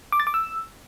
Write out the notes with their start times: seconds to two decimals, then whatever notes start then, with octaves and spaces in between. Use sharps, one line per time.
0.12 D6
0.20 A6
0.27 D6
0.34 E6